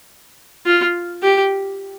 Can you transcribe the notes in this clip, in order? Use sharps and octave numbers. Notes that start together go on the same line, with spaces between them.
F4
G4